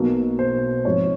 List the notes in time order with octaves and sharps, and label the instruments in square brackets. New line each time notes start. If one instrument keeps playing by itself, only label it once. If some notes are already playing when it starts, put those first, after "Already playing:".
Already playing: [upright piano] B1 B2 F#3 A#3
C5
G#2 F3 G#3 C4 C#5